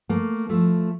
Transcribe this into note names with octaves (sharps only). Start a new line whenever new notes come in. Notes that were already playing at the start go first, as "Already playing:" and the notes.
A3 A#3
F3 A3